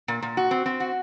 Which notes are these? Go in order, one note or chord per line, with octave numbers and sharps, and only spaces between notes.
A#2
A#2
F#4
C4
C4
F#4